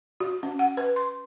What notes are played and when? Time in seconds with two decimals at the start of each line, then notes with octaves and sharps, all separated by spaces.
0.20 F#4
0.43 C#4
0.59 F#5
0.77 B4
0.96 C6